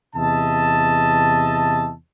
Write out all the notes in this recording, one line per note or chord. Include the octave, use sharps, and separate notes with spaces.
E2 C3 D#5 E5 A5